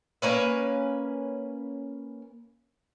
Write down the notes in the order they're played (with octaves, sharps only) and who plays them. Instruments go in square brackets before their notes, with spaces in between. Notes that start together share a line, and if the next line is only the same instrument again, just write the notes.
[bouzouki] A#3 C#4 B4